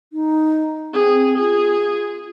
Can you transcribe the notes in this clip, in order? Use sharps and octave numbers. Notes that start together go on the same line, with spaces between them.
D#4
C4 G#4
F4 G#4